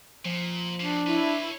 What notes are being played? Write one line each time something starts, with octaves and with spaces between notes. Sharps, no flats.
A#2 F3
E2 A#2 D4
E4 B4 C#5